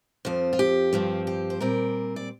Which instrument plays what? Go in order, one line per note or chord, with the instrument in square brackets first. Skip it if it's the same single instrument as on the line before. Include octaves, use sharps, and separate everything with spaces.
[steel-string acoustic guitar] F2 F3 C4 C5
F4
G4
G2 F3 C4
G4
C5
A#2 G3 C4 A#4
D5